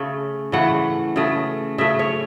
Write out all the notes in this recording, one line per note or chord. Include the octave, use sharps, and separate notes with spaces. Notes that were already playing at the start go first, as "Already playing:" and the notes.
Already playing: C#3 A3
C#3 E3 A3 F#5
C#3 A3
C#3 A3 E5
C#5